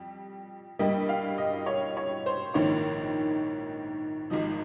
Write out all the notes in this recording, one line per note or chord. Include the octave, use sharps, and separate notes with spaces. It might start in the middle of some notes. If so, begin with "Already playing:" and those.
Already playing: F2 G3
G2 G3 A#3 D#5
F5
D#5
C#5
C#5
C5
A#1 G#2 D#3 A#3 C#5
G#1 G#2 F3 D#5